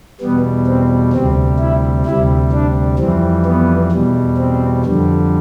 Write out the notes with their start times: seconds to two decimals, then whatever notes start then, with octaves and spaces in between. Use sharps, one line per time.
0.21 E2 B2 G3 B3
0.67 C4
1.13 D2 C3 G3 C4
1.60 E4
2.06 D2 C3 G3 E4
2.53 D4
2.99 F2 E3 G3 C4
3.45 B3
3.92 E2 B2 G3
4.38 C4
4.85 F2 D3 G3